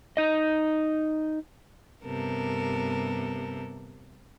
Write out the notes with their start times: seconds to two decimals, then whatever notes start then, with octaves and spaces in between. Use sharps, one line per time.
0.17 D#4 D#5
2.04 G2 C3 B3 A4 A#4